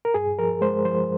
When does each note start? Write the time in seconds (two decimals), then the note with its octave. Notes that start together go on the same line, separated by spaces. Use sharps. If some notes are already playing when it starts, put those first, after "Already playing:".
0.05 A#4
0.14 G2 G#4
0.39 F3 A#4
0.61 G#3 C5
0.85 F3 C5